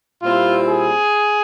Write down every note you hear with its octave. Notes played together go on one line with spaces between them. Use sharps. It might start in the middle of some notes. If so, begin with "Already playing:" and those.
A#2 G3 C4 E4 F4
G#4